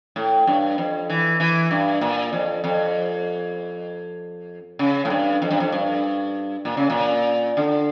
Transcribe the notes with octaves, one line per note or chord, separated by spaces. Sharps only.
A2
G2
F2
E3
E3
G2
A#2
F2
F2
C#3
A2
G2
F2
G2
F2
G2
A#2
C#3
A#2
D3